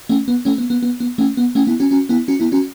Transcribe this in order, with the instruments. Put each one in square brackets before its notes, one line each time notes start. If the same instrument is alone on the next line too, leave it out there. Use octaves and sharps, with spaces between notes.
[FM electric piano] A3 C#4
B3
A3 C#4
B3
B3
B3
B3
A3 C#4
B3
A3 C#4
B3 E4
C#4 F#4
C#4 F#4
B3 E4
C#4 F#4
B3 E4
C#4 F#4